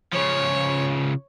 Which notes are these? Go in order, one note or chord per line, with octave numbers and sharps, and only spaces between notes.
C#3 F3 C#5